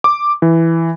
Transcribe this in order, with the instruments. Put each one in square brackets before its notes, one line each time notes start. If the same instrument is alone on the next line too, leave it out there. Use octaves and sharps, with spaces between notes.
[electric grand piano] D6
E3